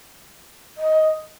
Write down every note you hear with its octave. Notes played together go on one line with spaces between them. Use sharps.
D#5